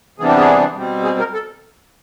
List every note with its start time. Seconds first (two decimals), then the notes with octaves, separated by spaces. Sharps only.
0.18 C3 E3 G3 B3 D4 G#4
0.28 G4
0.38 G#4
0.76 B2 G3 C4
1.04 G#4
1.19 A#4
1.33 A4